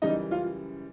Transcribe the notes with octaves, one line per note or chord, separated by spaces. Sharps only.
F#2 C#3 E3 G3 D#4 D#5
F4 F5